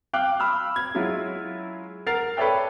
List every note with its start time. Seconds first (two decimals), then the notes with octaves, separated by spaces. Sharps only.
0.13 F5 G5 D6 F#6
0.40 B5 E6 F6
0.76 G#6
0.95 F#3 G#3 C#4 E4 F4
2.06 A#4 F#5 A6 C7 F7
2.37 A4 B4 C#5 D5 E5 G5